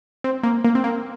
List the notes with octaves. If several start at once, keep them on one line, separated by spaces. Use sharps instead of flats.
C4
A#3
A#3
C4
A#3